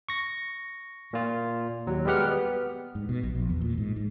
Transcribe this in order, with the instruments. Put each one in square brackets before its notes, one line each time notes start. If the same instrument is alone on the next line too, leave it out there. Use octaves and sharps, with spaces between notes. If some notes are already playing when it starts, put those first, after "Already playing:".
[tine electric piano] C#6 A#6
A#2 F4
D#2 F#3
G3 G#3 B3 G4 F#5 F6
B3
[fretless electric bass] G#2
B2
B1
A#1
E2
A#2
G#2
G#2